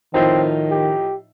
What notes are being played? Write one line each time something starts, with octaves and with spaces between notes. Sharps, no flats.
A2 D#3 F3 C4 D#4
G4